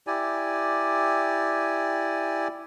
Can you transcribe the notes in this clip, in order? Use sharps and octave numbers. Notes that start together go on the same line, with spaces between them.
E4 G4 D5 G#5